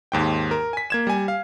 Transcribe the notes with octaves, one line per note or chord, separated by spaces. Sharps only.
D#2 G#2 G5
A#4
G#5 B6
A#3 G#6 E7
G3 G#5
F5